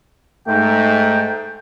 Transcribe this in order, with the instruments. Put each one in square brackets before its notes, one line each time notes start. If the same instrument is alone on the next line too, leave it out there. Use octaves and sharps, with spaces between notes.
[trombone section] G#2 [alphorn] A3 [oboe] G5